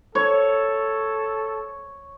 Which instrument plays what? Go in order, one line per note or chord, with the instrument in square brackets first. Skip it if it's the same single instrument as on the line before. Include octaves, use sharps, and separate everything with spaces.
[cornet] A4 [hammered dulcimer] C#5